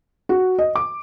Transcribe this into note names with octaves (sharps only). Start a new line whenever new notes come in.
F#4
D#5
D6